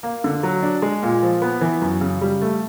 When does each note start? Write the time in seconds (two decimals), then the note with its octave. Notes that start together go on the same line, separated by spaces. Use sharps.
0.03 A#3
0.24 D3
0.43 F#3
0.63 D4
0.82 G#3
1.03 A#2
1.23 F3
1.42 B3
1.61 E3
1.81 F#2
2.01 C#3
2.22 G3
2.42 A3